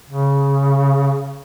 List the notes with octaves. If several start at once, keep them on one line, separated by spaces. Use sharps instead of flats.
C#3